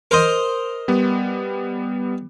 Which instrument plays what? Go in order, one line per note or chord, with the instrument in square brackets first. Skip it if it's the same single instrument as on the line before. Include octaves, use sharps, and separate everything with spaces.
[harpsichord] A#4 C5 D#5
[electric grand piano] G3 B3